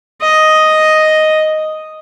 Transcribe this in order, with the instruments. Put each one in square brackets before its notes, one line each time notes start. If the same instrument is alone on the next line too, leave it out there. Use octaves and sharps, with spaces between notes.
[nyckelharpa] D#5